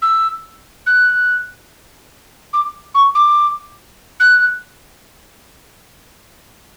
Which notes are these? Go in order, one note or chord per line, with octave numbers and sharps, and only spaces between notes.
E6
F#6
D6
C#6
D6
F#6